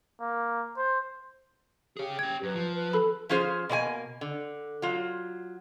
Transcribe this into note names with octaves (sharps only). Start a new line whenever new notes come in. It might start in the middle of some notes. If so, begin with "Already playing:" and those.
A#3
C5
G4 G#4 C#5
C#4 G5 G#6
F#2 B4
F3
B4
A4 B5
F3 C#4 F4 G#4 C5
B2 A#3 C#5 G#5
D3
F#3 F4